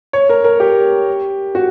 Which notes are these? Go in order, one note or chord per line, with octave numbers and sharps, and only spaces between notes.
C#5
A#4
A#4
G4
F#4